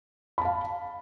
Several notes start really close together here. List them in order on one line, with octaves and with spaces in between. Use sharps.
B5 A5 F5